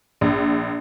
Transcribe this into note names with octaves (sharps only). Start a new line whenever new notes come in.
A#1